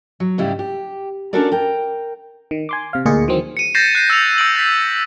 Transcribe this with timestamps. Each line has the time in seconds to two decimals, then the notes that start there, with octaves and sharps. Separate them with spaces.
0.20 F#3
0.38 G#2 C#3 G3 E4 G4
0.59 G4
1.33 C#4 D4 F#4 A4 A#4 D5
1.51 A#4 G5
2.51 D#3
2.69 G#5 C6 D6
2.93 C3 F5
3.06 D2 A#2 D#4 F4 G#4 C#7
3.28 D#3 E3 F#3 C4
3.57 C#7 D#7
3.74 G6 A6 A#6 C7 E7
3.95 F#6 C7
4.10 E6 G6 F7
4.38 E6 D7 F#7
4.56 G6 A6 B6 C7